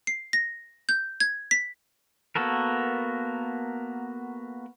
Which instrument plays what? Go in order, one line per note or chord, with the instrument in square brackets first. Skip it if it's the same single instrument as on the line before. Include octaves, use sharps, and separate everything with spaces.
[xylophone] C7
A#6
G6
G#6
B6
[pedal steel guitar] A#3 B3 F#4 A4 A#4